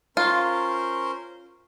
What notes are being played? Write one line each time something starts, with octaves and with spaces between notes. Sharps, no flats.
C#4 F4 A#4 C5